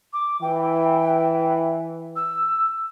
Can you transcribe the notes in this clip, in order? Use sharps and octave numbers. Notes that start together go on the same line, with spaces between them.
D6
E3 G5
E6